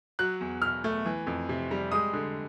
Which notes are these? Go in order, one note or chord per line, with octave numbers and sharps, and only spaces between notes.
F#3 F#6
E2
B2 F6
A3
E3
F2
C3
G3
G#3 D#6
D3